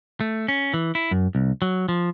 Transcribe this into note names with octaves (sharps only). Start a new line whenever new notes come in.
A3
C#4
E3
E4
F#2
C2
F#3
F3